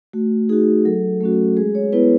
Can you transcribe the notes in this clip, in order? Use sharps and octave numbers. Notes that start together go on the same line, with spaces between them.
A3 F#4
D#4 F#4 G#4
F#3 A4
A3 C#4 F#4
G#3 G#4
C#5
B3 E4 B4